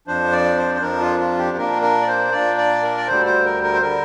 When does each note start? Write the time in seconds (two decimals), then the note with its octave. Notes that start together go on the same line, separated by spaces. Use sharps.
0.07 F2 F3 D4 C5
0.32 D5
0.58 C5
0.75 C5
0.82 F2 F3 D4 A#4
1.01 F4
1.20 F4
1.38 G4
1.57 A#2 A#3 D4 A#4
1.82 A#4
2.02 D5
2.07 C5
2.32 A#2 A#3 D4 D5
2.57 D5
2.82 A#4
2.97 D5
3.07 D2 D3 G3 C5
3.26 C5
3.45 A#4
3.63 A#4
3.74 C5
3.82 D3 G3 A#4